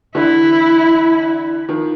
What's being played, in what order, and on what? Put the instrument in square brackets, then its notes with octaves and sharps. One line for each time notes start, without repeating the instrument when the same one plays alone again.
[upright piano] D3 E3 [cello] E4
[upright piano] D#3 F3